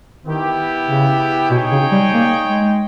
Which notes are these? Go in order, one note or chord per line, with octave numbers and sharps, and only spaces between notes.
D#3 B3 E4 G4
C#3
B2 D#4 G#4 C#5 G5
C#3
G3
A#3
G#3